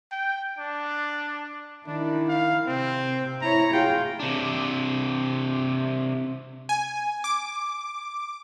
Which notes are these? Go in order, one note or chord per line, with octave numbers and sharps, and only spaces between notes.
G5
D4
D#3 D4 E4
F5
C3 C4
E4 C#5 A#5
F4 G#4 G5
C3 D4
G#5
D6